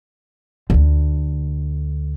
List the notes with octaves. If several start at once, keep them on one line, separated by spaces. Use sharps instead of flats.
D2 D3